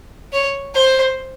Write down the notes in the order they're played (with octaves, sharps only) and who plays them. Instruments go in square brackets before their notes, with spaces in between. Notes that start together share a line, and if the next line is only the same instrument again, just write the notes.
[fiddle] C#5
C5